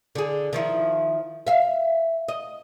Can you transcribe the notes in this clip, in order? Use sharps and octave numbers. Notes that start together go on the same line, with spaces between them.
D3 G#4
D#3 F3 E4
E5 F5
D#5